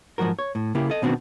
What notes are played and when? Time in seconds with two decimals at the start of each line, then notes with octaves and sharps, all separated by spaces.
0.18 G#2 F3 F#3 F#4 A#4
0.39 C#5
0.55 A2
0.75 C#3 A#3 E4 G4
0.90 A4 D#5
1.02 B2 D#3 B3 C4 D4 F#4